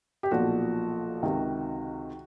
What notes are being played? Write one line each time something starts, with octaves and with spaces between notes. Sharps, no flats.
G4
B1 A#2 F3 F#4
C#2 C3 D#3